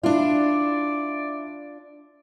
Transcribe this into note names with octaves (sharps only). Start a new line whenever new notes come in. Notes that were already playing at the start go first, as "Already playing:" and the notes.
D4 E4 F4 D5